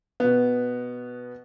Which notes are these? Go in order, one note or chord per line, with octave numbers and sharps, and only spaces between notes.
B2 B3